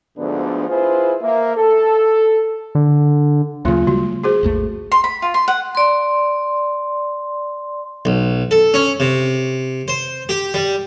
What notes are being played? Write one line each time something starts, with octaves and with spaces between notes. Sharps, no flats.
D2 G#2 D3 F3 B3 D4
E4 F4 G#4 B4 C5
A#3 E5
A4
D3
D2 C#3 F#3 A#3 F4
C#3 G3 G#3 F#4
F#4 G#4 C5
G#1 D#2 A3
C6
B5
F4
C6
F#5
D5 C6
B1
A4
C#4
C3
C5
G4
G3